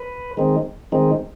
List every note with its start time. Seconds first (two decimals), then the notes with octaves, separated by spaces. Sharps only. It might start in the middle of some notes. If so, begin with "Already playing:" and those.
Already playing: B4
0.37 D#3 G#3 C4 D#4
0.92 D#3 G#3 C4 D#4